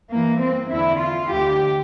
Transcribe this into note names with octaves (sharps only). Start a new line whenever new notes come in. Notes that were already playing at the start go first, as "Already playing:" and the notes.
G2 E3 A#3
C4
E2 D3 E4
F4
D2 D3 G4